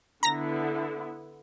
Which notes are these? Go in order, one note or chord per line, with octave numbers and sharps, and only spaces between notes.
D3 B3 E4 A#5 A#6